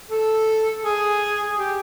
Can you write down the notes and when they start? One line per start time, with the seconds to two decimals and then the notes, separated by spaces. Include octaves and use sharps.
0.10 A4
0.83 G#4
1.57 G4